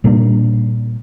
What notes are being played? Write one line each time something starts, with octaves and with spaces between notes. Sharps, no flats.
A#2 G3 A#3 D4